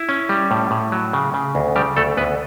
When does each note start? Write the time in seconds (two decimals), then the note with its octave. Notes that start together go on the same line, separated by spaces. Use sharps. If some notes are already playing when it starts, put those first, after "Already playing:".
Already playing: E4
0.09 C#4
0.29 G3
0.51 A2
0.71 A2
0.92 F#3
1.13 C#3
1.34 C#3
1.55 D2
1.76 C#3 G3 G4
1.97 D2 A3 A4
2.17 D2 B3 B4